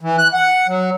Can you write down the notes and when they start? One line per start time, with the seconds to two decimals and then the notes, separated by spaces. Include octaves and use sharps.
0.01 E3
0.18 F#6
0.33 F#5
0.68 F#3